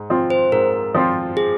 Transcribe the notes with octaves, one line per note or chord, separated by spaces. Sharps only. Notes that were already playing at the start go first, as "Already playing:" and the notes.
Already playing: G#2
F3 C4 F4
C5
G#2 A#4
F3 C4 F4
G#4